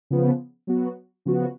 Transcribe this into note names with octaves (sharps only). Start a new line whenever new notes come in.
C#3 F3 B3
F#3 B3 F#4
C#3 F3 B3 F#4